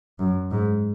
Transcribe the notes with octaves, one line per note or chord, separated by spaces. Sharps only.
F#2
G#2